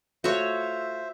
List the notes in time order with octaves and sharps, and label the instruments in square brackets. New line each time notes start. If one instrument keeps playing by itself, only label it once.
[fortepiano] A3 F4 F5 [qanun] F#4 C#5 [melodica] C5 E5